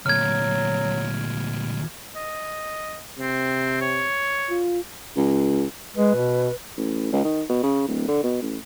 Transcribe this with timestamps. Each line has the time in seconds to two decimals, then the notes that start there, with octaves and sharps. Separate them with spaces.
0.06 D2 A#2 F#3 F6 G#6
2.15 D#5
3.19 C3 C4
3.81 C#5
4.50 F4
5.16 C#2
5.96 G#3 B4
6.15 B2
6.77 A1
7.12 C#2
7.24 D#3
7.49 B2
7.63 C#3
7.88 D1
8.08 D3
8.24 B2
8.42 A1